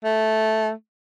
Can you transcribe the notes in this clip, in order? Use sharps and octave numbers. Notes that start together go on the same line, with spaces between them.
A3